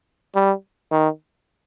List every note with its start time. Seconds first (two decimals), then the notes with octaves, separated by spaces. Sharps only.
0.35 G3
0.92 D#3